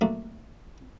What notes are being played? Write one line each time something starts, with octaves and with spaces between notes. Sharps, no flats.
B1 A3 A#3 D4